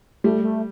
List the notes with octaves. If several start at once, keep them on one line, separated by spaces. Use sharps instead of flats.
G3 A3
A3